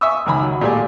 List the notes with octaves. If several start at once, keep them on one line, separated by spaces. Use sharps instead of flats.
E5 G#5 C#6 D#6 E6
C#2 D#3 G#5 A#5 B5
F#3
A#2 G#3 A3 G4 D5 G#5